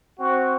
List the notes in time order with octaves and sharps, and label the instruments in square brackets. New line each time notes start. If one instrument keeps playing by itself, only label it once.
[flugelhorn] C4 [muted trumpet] F#4